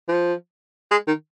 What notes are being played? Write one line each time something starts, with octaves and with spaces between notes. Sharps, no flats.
F3
G#3
D#3